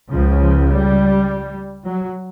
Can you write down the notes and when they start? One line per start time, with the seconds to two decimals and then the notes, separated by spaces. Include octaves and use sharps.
0.10 C#2 C#3 F3
0.40 F3
0.68 G3
1.85 F#3